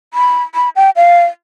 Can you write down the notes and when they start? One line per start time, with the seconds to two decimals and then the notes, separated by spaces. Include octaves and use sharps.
0.14 B5
0.55 B5
0.76 G5
0.96 F5